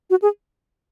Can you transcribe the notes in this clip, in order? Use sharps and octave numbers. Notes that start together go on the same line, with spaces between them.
F#4
G#4